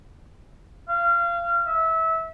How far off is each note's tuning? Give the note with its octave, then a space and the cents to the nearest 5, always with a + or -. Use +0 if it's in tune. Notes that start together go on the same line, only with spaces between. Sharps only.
F5 -25
E5 -20